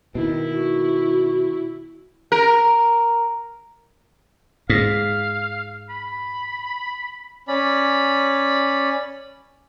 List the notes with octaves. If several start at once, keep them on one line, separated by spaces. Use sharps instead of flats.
B2 D#3 E4
F#4
A#4
G#2 F5
B5
C#4 D5 B5